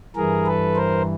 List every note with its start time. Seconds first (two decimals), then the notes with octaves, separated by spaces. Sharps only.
0.16 G2 E3 G#4 A#4
0.46 A4 B4
0.76 A#4 C5